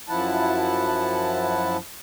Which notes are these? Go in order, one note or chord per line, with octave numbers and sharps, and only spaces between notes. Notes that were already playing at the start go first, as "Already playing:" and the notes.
F#2 F3 E4 F#5 A5